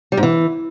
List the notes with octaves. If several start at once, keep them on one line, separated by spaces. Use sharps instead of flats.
G3
G#2
E3